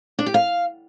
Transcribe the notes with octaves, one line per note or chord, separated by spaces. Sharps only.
D4
G4
F5